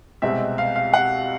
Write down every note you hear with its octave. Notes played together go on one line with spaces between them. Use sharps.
C2 B2 G#3 C4 E5
F5
F5
F#5